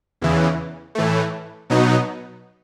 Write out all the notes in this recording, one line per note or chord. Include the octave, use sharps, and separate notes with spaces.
E2 C#3 E3
A2 E3 A3
B2 F#3 B3 D#4